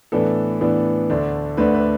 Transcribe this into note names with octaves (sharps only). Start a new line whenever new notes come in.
A2 E3 B3 D4 A4
A2 E3 B3 D4
D2 D3 A3 D4
D2 D3 A3 D4 B4
B4